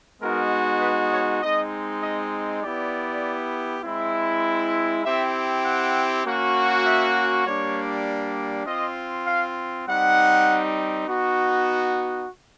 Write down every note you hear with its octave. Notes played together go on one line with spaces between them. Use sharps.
G#3 B3 D#4 F#4 A#4
B4
C#5
G#3 C4 D#4 D#5
D#5
B3 E4 G4 D5
G#3 C4 E4
C4 E4 G4 E5
F#5
A#3 C#4 F#4
E5
G3 A#3 D4 G4 C#5
C4 F4 D#5
F5
G3 C4 D#4 F#5
B3 D#4 F#4